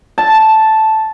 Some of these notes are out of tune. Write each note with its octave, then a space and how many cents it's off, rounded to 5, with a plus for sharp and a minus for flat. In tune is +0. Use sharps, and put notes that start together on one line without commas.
A5 -5